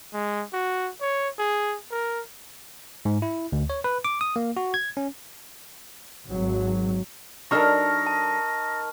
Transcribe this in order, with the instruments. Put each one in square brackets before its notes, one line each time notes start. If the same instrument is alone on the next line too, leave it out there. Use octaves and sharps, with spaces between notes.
[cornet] G#3
F#4
C#5
G#4
A#4
[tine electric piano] G#2
E4
D2
C#5
B4
D6
D#6
A#3
F#4
G#6
C#4
[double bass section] G#1 F#3
[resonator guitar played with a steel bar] F#3 D4 A4 [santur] D#4 A#4 [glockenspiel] C#6 F6 [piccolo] A#6
[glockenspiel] A5